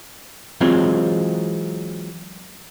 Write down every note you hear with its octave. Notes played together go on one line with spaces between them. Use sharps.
E3 F#3 G#3 C4 F4